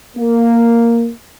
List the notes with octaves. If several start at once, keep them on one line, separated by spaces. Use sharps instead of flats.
A#3